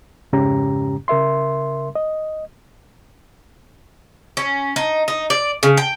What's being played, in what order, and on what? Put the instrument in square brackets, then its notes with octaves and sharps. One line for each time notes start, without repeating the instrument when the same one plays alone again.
[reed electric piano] F2 G#2 C#3 C#4 G4 A#5
C#3 A#4 E5 C6
D#5
[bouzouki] C#4
D#4
D#4
D5
C#3
G5